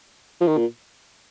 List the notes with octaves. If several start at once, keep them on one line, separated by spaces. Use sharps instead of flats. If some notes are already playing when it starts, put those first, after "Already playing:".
F3
D#3
A#2